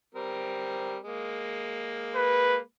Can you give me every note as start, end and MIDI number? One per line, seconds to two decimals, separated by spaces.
0.15 0.97 55
0.15 0.97 60
0.15 0.97 70
1.03 2.59 56
1.03 2.59 58
2.15 2.59 71